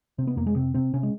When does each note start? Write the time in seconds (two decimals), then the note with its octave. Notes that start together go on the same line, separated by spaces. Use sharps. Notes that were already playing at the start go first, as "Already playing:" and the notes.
0.18 C3 C4
0.27 B3
0.36 F2 A#3
0.47 G#3
0.56 C3 C4
0.74 C3 C4
0.93 C3 C#4
1.03 G#3